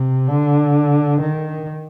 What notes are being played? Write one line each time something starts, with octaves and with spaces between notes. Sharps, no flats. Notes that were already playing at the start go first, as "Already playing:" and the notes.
Already playing: C3
D3
D#3